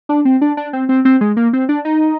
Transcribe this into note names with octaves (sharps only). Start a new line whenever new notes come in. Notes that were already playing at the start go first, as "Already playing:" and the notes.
D4
C4
D4
D4
C4
C4
C4
G#3
A#3
C4
D4
D#4